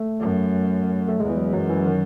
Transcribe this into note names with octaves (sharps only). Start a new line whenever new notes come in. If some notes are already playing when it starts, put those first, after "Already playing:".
Already playing: A3
F#2
A3
E2 G#3
E3
F#3
F#2 F#3
E3
D#3